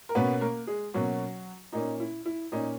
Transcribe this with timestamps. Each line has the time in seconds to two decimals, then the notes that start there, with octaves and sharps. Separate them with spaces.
0.09 A#4
0.15 B2 A#3 B3 C#4 B4
0.41 A#3 A#4
0.67 G#3 G#4
0.94 B2 F#3 A#3 C#4 F#4
1.73 A#2 A#3 C#4 D#4
2.00 E4
2.26 E4
2.52 A#2 A#3 C#4 D#4